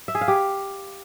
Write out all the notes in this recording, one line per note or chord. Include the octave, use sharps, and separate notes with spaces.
E5
G#4
F5
G4